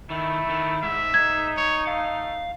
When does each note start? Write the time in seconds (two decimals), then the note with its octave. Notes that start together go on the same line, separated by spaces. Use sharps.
0.10 D#3 A3 E4
0.50 D#3
0.82 G#2 E5
1.14 D#4 G#6
1.57 C#5
1.87 A3 F5